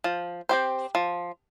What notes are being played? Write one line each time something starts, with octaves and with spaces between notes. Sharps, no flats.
F3
C4 G4 C5
F3